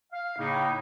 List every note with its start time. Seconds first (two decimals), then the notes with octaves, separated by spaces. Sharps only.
0.12 F5
0.38 A2 C#3 A#3 D#4